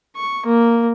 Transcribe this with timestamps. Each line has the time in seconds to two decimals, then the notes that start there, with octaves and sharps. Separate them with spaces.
0.16 C#6
0.46 A#3